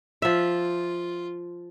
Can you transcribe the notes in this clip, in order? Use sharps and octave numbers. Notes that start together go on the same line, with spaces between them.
F3 F4 E5